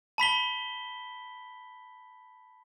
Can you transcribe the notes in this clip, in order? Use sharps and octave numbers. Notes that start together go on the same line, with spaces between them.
A5 B5 B6 G7